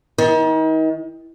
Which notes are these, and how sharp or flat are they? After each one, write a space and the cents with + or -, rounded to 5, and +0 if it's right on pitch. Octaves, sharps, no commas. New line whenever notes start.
D#3 +35